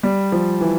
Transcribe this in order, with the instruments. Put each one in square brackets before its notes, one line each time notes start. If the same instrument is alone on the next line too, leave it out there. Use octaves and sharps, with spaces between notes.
[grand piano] G3
F3
E3